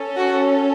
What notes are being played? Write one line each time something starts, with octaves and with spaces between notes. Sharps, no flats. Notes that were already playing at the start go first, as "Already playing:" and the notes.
Already playing: C#4 A4
F#4 F#5